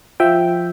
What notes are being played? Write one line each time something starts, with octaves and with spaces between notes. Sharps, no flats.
F3 E5 G5